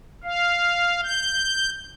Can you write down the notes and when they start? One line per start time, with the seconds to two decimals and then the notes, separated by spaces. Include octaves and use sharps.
0.24 F5
1.03 G6